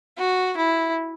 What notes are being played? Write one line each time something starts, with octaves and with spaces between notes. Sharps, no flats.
F#4
E4